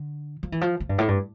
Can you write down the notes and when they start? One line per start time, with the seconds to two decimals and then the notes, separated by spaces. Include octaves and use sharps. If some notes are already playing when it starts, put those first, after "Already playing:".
Already playing: D3
0.43 F3
0.52 E3
0.61 F3
0.80 F3
0.89 G2
0.98 A2
1.08 G2